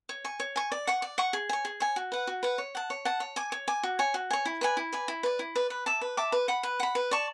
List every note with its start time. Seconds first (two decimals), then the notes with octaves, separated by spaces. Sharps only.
0.09 C#5
0.24 G#5 C#6
0.40 C#5
0.56 G#5 C#6
0.72 D5
0.87 F#5 C#6
1.02 D5
1.18 F#5 C#6
1.33 G#4
1.49 C#5 G#5
1.65 G#4
1.80 C#5 G#5
1.96 F#4
2.12 B4 F#5
2.27 F#4
2.43 B4 F#5
2.58 C#5
2.75 F#5 A5
2.90 C#5
3.05 F#5 A5
3.20 C#5
3.36 G#5 D6
3.52 C#5
3.68 G#5 D6
3.83 F#4
3.99 C#5 G#5
4.14 F#4
4.30 C#5 G#5
4.45 E4
4.61 B4 D5 G#5
4.77 E4
4.93 B4 D5 G#5
5.08 E4
5.23 B4 D5
5.39 E4
5.55 B4 D5
5.70 B4
5.86 E5 A5 D6
6.01 B4
6.17 E5 A5 D6
6.32 B4
6.48 F#5 B5
6.63 B4
6.80 F#5 B5
6.95 B4
7.11 D5 A5 C#6